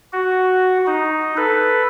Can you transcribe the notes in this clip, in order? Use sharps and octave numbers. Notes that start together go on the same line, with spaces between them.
F#4
D#4
A4 B4